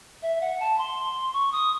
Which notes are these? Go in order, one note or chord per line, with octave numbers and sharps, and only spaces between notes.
E5
F#5
A5
C6
C#6
D#6